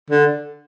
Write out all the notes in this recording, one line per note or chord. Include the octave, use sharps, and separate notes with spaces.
D3